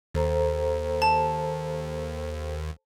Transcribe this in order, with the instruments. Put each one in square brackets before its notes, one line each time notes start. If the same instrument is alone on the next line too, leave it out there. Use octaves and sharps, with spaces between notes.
[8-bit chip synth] D#2 [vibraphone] A4 C5 A#5
[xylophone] A5